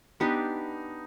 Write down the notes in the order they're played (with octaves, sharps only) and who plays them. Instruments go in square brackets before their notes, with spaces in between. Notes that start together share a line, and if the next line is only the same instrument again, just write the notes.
[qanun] B3 D4 G4 B4 [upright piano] D#4